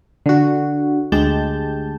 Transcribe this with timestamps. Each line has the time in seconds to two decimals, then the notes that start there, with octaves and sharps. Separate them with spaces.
0.26 D3 F#4
1.12 D2 G#3 G4 A5 G6